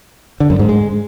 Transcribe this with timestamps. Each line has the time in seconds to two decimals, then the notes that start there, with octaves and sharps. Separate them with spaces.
0.40 D3
0.50 F#2
0.59 G#2
0.69 G#3